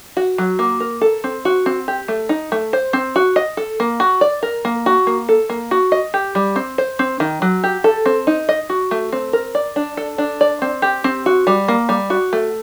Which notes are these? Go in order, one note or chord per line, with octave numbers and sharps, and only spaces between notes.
F#4
F#3
A#3
A#4
A4
C4
F#4
C4
G4
A3
D#4
A3
C5
C4
F#4
D#5
A4
A#3
F#4
D5
A#4
A#3
F#4
A#3
A4
A#3
F#4
D#5
G4
G3
C4
C5
C4
D#3
F#3
G4
A4
C4
D#4
D#5
F#4
A3
C4
A#4
D5
D4
A4
D4
D5
C4
G4
C4
F#4
G3
A#3
G3
F#4
A3